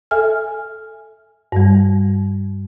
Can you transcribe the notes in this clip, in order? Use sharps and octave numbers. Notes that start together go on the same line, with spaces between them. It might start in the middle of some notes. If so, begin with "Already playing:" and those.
A4 E5 G#5 F6
G2 G3